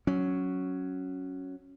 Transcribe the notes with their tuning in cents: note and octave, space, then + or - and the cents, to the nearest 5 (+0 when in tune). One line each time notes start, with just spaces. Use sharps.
F#3 +0 C#4 +0